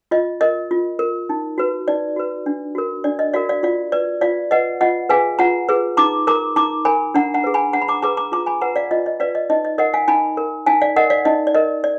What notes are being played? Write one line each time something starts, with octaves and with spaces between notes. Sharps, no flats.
F4 D#5
A#4 D#5
F4
A#4
D#4
F#4 B4
D#4 D5
F#4 B4
D4
F#4 A#4
D4 D5
D#5
F#4 A#4 D5 F5
D5 F5
F4 D5 F5
B4 D5
F4 D5 F5
B4 D#5 F#5
F4 D#5 F#5
G#4 B4 F5 G#5
F4 F#5 A#5
G#4 B4
D#4 A#5 D6
A#4 A#5 D6
D#4 A#5 D6
A#4 G#5 B5
D4 F#5 A#5
F#5 A#5
G#4 B4
G#5 B5
D4 F#5 A#5
B5
A#5 D6
G#4 B4 A#5 D6
A#5 D6
F4 A#5 D6
G#5 B5
B4 F#5 A#5
D5 F5
F4 D#5
D#5
B4 D5 F5
D#5
D#4 D#5
D#5
A#4 D#5 F#5
F5 G#5
D#4 G#5 B5
A#4
D#4 F5 G#5
D5 F5
A#4 D#5 F#5
D5 F5
D#4 D#5
D5
A#4 D#5
D5